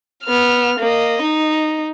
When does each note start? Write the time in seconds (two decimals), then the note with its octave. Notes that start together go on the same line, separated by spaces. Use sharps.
0.24 B3 F6
0.79 A#3 D#5
1.22 D#4